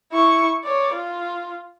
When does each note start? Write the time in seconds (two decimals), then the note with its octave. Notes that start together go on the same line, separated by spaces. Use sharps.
0.12 E4 C#6
0.64 C#5 D5
0.93 F4